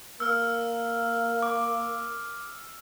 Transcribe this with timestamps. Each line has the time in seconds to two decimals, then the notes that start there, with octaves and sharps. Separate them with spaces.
0.20 A#3 E6 F6
1.43 D6